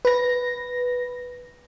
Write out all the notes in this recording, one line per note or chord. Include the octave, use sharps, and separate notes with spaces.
B4 A#6